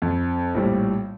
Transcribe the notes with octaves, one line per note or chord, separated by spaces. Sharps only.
F2
A#1 A2 G3